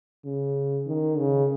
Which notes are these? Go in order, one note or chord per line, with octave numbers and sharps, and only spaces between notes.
C#3
D#3
C#3